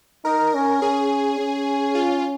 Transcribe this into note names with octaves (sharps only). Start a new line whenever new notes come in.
D#4 A#4
C#4
C#4 G#4
C#4
F4